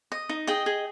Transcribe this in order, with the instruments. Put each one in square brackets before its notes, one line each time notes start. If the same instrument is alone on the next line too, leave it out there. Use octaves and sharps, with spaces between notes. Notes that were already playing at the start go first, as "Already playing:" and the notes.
[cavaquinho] D#5
D#4
G#4 D#5 G5
G#4